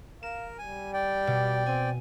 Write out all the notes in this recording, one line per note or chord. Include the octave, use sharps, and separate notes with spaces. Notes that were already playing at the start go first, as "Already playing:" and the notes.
A#4 F5 E7
G3 G#5
D5 G5
B2
C4 G#5